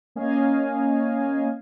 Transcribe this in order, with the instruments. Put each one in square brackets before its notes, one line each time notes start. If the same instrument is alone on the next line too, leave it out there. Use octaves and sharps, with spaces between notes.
[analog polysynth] A#3 C#4 D#5 F5 G#5